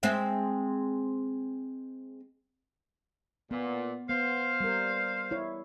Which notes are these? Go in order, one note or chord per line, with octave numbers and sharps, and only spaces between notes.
G#3 C4 E5
A#2 B3
B3 C5 F5
G3 A#4
E4 C#5